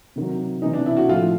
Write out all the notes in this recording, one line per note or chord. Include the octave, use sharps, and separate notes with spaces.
C3 D#3 F#3
C3 E3 D#4
D4
E4
F#4
A2 F3 F4